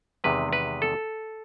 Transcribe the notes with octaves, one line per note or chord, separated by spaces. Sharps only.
E2 C3 D#3 G#3 B4
B4
A4